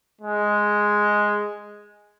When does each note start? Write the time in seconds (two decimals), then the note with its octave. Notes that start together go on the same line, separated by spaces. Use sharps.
0.21 G#3